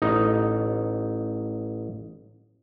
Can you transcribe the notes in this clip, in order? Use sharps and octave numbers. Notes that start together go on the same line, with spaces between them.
A1 D#4